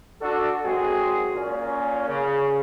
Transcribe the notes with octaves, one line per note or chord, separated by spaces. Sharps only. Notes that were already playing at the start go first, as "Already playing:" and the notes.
D4 F#4 A4
G#1 F#3 G#3 C4 F#4 G#4
A#2 C#4
C#3